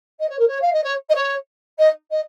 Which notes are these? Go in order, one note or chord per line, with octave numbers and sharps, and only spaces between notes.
D#5
C#5
A#4
C#5
F5
D#5
C#5
D#5
C#5
D#5
D#5